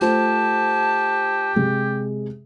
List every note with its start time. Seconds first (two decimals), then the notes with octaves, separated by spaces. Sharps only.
0.01 A3 F4 G4 C5 A5
1.56 C3 G#3